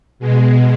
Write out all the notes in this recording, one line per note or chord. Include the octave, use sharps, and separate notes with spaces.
B2 G#3